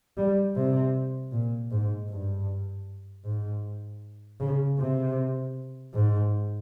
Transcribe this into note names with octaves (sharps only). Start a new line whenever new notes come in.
G3
C3
A#2
G#2
G2
G#2
C#3
C3
G#2